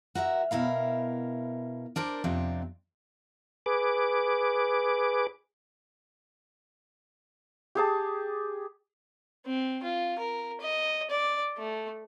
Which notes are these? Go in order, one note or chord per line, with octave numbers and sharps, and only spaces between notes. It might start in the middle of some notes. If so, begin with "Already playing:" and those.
F#4 A#4 D#5 E5
B2 E4 A#4 F5
D4 A#4 C5 D5
F2 C3 C4 D4
G#4 B4 D6
G4 G#4 A5
C4
F4
A#4
D#5
D5
A3